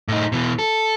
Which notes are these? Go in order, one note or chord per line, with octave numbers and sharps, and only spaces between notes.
A2 D#4
B2 E3
A4